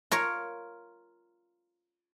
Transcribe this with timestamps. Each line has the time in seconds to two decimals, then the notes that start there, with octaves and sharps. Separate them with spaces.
0.12 F4 A#4 C#5